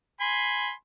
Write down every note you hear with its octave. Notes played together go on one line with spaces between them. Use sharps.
G#5 B5 C6